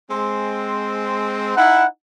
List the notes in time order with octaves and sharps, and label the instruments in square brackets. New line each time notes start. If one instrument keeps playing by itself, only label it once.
[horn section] G#3 C4
[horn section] D#4 E4 [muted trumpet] F#5